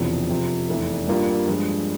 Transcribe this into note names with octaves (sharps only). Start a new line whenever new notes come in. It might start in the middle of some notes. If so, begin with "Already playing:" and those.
Already playing: E1 E2 C3 F3
F2 C3 F3
F1 E2 E3
G2 G3 A#3 F4
G2 F3 G#3